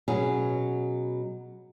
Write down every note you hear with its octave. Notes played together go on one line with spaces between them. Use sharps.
B2 F#3 C#4 G#4